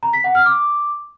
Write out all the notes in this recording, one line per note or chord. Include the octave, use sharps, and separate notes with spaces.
A#5
B6
F#5
F6
D6